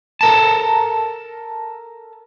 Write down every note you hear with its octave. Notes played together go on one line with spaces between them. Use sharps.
A4 A#4 A5